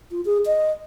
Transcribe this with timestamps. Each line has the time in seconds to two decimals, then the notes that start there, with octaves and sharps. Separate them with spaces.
0.11 F4
0.25 G#4
0.46 D#5